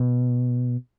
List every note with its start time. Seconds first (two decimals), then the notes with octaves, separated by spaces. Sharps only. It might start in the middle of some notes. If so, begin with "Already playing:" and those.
Already playing: B2